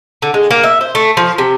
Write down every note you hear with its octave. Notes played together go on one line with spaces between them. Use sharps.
D3
G#3
A#3
E5
C5
A3
F3
C3